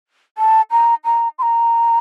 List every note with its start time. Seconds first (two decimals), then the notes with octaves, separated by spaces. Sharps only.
0.38 A5
0.71 A#5
1.05 A#5
1.39 C6
1.42 A#5